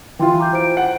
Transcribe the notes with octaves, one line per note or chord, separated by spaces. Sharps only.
E3 F4 G5 C6
A#5 D6 G6
F#4 C5 D7
F#5